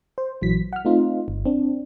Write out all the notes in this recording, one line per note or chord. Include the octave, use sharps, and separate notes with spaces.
C5
A#1 E3 F#3 B6
F#5 F6
A3 C4 D#4 F4
G1
C4 D4